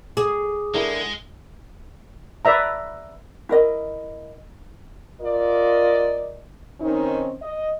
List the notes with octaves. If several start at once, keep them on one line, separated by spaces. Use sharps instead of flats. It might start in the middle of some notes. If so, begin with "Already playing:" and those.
G#4 D6 D#6
D3 G#3 E4 A#4
B4 D5 E5 A#5
E4 A#4 D#5
F4 A#4 D5 D#5
D#3 C4 C#4 D#4
D#5